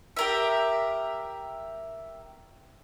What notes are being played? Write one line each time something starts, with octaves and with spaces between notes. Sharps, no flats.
G4 A#4 E5